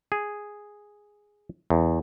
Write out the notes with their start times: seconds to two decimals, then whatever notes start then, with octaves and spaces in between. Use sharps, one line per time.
0.12 G#4
1.70 E2